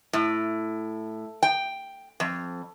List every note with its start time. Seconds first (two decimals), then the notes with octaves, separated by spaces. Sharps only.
0.13 A2
1.43 G5
2.20 F2